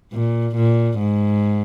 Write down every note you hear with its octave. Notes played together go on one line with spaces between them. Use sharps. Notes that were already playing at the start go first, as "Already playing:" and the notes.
A#2
A#2
G#2